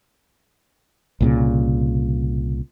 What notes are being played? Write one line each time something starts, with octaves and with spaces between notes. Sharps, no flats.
C2 A#2 C#3